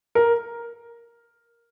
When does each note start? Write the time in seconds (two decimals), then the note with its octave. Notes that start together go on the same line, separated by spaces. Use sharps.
0.15 A#4